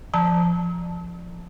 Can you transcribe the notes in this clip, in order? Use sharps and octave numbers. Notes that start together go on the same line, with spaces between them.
F3 A5 A#5